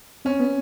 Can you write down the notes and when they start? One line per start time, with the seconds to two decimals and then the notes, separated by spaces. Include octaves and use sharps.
0.25 C4 C#4
0.40 B3